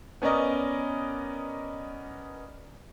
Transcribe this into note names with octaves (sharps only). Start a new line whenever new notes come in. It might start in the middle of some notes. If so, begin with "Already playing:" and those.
B3 C#4 A#4 D5 D#5